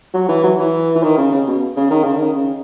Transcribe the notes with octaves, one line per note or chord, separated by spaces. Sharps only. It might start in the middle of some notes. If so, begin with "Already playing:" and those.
F#3
E3
F#3
E3
E3
D#3
C#3
C#3
B2
C#3
D#3
C#3
D#3
C#3